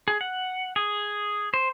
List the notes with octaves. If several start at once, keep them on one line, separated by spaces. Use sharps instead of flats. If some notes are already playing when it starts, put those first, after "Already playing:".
G#4
F#5
G#4
C5